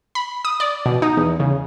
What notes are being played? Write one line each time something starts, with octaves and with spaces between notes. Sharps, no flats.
B5
D#6
D5
B2
D#4
E2
C#3